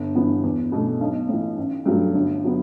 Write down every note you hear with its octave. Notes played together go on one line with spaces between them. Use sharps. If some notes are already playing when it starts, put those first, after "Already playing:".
Already playing: G1
G2 E3 B3
E2
B2 A3
B1
A2 E3
A1
G2 F#3 A3
G1
F#3 B3